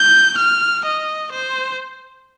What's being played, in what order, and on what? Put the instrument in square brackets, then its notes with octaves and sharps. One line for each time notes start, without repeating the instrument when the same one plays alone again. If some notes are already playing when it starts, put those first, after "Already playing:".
Already playing: [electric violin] G6
F6
D#5
C5